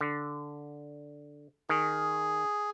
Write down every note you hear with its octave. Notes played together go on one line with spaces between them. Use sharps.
D3
D#3 G#4